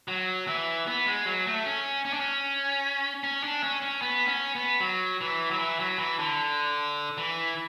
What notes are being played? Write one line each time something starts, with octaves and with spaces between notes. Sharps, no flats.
F#3
E3
B3
G#3
F#3
A3
C#4
C#4
D4
C#4
C#4
D4
C#4
C#4
B3
C#4
B3
F#3
E3
F#3
E3
F#3
E3
D3
E3